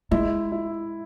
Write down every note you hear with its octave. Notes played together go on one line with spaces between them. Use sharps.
G#3 E4
E4